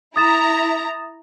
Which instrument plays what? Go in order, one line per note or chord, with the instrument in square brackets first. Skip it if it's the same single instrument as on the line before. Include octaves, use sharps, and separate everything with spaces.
[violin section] E4 A#5 [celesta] D#6 A6 E7